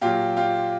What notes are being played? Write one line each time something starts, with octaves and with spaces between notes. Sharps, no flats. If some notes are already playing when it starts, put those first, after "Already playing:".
A#2 F#3 F4 G4
F4 G4